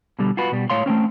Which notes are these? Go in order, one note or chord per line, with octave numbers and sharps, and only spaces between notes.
B2 D3 G3
F4 F#4 B4
B2 G3
A2 C#5 F5 C6
A3 A#3 C4 C#4